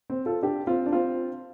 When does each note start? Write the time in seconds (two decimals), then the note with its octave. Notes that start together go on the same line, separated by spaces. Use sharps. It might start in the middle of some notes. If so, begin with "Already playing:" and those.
0.10 C4
0.26 F4 A4
0.42 D4 G4
0.67 C4 F4
0.86 D4
0.92 C4 F4